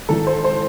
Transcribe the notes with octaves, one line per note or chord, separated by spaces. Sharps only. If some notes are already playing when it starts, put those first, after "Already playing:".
G#1 G#2 E3 A4
C5
C5